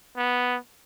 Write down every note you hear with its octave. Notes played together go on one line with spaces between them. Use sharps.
B3